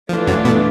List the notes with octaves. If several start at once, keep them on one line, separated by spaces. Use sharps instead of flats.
E3 F3 A3 D4 F4
F#2 F#3
B2 B3